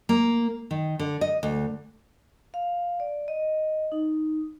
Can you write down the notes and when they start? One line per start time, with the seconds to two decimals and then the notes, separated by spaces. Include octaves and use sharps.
0.09 A#3
0.71 D#3
0.99 D3
1.21 D#5
1.43 D2
2.54 F5
3.00 D5
3.28 D#5
3.92 D#4